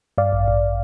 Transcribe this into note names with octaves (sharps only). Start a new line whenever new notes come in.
G2 D5 F5
A1
A1